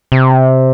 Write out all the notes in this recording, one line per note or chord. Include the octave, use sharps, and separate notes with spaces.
C3